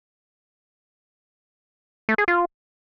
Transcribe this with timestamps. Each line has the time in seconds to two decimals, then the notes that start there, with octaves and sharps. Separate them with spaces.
2.09 A3
2.18 G#4
2.28 F4